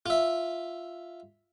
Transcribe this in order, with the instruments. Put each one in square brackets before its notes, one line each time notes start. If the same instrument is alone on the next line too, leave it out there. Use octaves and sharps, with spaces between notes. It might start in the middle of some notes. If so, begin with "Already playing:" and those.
[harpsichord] F4 E5